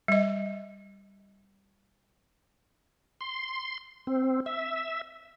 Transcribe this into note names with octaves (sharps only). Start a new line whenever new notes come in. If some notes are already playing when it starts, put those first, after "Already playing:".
G3 D#5
C6
C4
E5